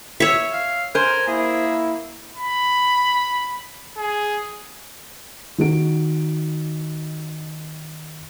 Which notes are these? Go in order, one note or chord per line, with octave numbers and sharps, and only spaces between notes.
C#5 E5
F5
A#4 C5 G#5
A#3 E4 G#4
B5
G#4
D#3 F#4 D7